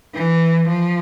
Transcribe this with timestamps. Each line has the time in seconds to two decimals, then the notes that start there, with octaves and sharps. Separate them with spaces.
0.14 E3
0.68 F3